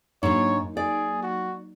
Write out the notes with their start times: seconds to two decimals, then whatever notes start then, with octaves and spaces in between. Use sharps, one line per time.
0.23 G#2 F#3 A#3 D4 D#4 C#5
0.77 G#4 D5
1.23 F#4